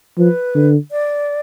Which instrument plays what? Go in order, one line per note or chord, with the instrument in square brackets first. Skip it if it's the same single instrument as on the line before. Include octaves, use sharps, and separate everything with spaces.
[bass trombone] F3 [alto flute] B4
[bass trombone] D3
[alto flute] D5